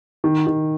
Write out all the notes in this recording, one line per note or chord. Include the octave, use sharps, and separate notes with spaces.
D#3
D#3